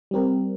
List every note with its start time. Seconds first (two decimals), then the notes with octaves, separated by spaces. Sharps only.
0.11 G3 C4 G4 A#4